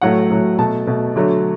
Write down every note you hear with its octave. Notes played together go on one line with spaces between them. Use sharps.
A2 F#3 A3 F#5
A2 F#3 A3
B2 A3 A5
B2 A3
D3 F#3 A3